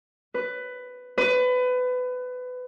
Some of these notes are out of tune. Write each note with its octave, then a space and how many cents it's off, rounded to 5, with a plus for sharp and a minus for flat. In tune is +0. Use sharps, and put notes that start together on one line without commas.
B4 +15
B4 +25